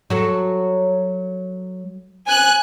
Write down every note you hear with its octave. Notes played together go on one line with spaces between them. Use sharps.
F#3 F#4 A4
G#5 F#6